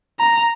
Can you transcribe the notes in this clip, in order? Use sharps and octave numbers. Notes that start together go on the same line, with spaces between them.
A#5